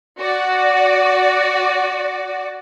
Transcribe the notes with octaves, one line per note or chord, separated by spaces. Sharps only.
F#4 D5